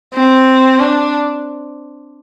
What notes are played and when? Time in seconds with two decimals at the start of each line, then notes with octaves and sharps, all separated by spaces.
0.13 C4
0.79 D4